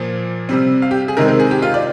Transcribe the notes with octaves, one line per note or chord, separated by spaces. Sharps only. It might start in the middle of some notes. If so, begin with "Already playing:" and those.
Already playing: A#2 F3 A#3
C3 G3 C4
F5
G4
G#4
C3 D#3 G#3 C4 A#4
A#4
G#4
G4
F4
D5